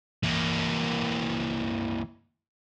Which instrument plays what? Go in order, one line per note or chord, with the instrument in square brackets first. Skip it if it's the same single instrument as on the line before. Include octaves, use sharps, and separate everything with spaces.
[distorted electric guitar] E3 A#3